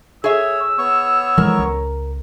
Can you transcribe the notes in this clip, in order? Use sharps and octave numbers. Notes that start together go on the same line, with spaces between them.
G#4 C#5 E5 E6
B3 C#5 C#6
E3 F3 G#3 A#4
C#2